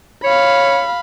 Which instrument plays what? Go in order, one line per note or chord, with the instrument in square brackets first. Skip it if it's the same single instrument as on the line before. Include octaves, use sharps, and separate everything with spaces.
[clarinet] C#5 [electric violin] F5 B5